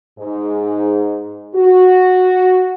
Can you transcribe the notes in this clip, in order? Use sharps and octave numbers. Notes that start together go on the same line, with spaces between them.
G#2
F#4